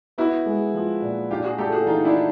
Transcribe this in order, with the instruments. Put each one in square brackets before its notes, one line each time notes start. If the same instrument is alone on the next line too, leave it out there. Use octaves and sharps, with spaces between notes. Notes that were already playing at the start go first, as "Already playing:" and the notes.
[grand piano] B3 [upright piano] E4 F#4
[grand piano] G#3
F3
A#2
[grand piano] D4 [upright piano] F4 G4
[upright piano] F#4 G#4
[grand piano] A3 [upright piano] G4 A4
[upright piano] F#4 G#4
[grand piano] E3 [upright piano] D#4 F4
[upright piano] D4 E4